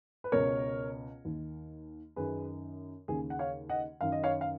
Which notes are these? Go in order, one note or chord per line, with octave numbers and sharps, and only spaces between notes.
B4
C#2 B2 A#4 C#5
D#2 D#3
F#2 D#3 G#4 B4
D#2 C#3 G#4
F#5
C#5 F5
D#5 F#5
F#2 D#3 F5
D#5
C#5 F5
F5